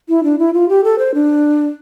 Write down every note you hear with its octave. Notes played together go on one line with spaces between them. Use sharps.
E4
D4
E4
F4
G4
A4
C5
D4